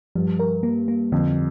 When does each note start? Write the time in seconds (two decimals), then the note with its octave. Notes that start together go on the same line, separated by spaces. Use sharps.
0.15 G2 F3
0.39 A#4
0.63 A#3
0.88 A#3
1.12 F2 D3